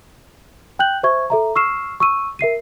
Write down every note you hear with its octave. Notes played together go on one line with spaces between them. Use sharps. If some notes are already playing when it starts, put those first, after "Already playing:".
G5 F#6 G6 F#7
C5 E5 C#6 G#6
A4 E5 A#5
C#6 E6 F6 C7 E7
C#6 E6 D#7
A#4 E5 C7 D#7